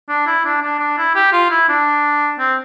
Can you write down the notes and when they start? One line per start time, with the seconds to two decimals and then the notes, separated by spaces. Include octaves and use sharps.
0.09 D4
0.27 E4
0.45 D4
0.62 D4
0.79 D4
0.98 E4
1.15 G4
1.32 F4
1.50 E4
1.69 D4
2.39 C4